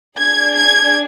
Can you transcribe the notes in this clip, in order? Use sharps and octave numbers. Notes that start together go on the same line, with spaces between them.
D4 G#4 G#6
G#6